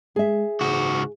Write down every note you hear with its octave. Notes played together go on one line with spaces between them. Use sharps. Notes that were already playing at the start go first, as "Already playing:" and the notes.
G#3 G#4 E5
C#2 G#2 F#4